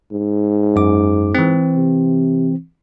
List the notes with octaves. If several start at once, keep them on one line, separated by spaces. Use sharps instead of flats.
G#2
F#2 D6
E3 C4
C3